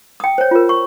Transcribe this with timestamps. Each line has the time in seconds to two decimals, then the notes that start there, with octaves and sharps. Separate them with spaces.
0.20 G5 D#6
0.38 C5 C#5
0.51 F4 A#4
0.69 C#6